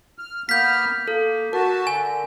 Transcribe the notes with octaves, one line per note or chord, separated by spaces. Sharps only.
F6
A#3 B3 F6 G6 B6
A#3 A4
F#4 A#4 A5
D3 G#5